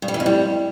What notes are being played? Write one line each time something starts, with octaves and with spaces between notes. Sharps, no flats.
G2
G3
E3
F2
G3